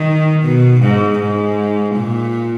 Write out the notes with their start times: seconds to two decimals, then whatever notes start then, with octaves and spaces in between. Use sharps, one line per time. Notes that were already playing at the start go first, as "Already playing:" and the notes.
Already playing: D#3
0.43 B2
0.81 G#2
1.20 G#2
1.95 A#2